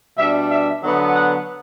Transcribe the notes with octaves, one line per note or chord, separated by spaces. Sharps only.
B2 G3 D4 E5
E5
D3 F#3 B3
F#5